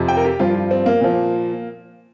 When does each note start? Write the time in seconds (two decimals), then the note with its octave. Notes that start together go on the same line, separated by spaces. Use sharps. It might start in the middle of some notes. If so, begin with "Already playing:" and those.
Already playing: F2 C3 F3
0.08 G5
0.17 A#4
0.25 G4
0.39 G2 F3 F4
0.54 F4
0.71 C4
0.86 A#3
1.01 A#2 F3